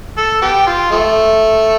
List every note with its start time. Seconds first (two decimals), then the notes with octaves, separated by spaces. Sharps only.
0.18 A4
0.42 B3 G4
0.67 F4
0.92 F3 A3